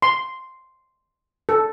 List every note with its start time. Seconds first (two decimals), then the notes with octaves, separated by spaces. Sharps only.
0.02 C6
1.49 A4